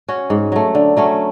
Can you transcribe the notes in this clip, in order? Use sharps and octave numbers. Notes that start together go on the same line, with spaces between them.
C#4 F#4
G#2
F#3 A3
D3
F#3 A3 C#4